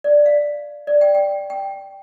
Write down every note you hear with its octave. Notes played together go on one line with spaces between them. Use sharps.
D5
F5
D5
G5
G5
G5